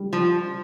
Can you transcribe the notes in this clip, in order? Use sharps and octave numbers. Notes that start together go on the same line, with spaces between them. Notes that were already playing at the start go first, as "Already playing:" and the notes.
Already playing: G3
F3